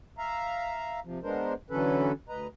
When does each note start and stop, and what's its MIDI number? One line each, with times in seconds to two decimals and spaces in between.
0.18 1.00 76
0.18 1.00 77
0.18 1.00 82
1.05 1.19 48
1.05 1.19 53
1.23 1.54 56
1.23 1.54 59
1.23 1.54 62
1.23 1.54 70
1.23 1.54 72
1.70 2.12 50
1.70 2.12 52
1.70 2.12 54
1.70 2.12 61
1.70 2.12 69
1.70 2.12 71
2.29 2.47 38
2.29 2.47 71
2.29 2.47 75
2.29 2.47 82